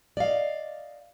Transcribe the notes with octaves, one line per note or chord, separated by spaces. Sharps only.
D5 D#5 F5